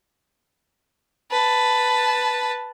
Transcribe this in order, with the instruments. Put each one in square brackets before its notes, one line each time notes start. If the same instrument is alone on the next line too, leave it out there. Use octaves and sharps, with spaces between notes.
[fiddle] B4 A5